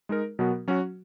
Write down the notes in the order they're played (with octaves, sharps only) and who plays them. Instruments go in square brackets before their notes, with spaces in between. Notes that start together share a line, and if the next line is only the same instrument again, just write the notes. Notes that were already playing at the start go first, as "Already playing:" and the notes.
[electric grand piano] G#3 D#4 A#4
B2 F#3 B3 F#4 A#4
F#3 C#4 F#4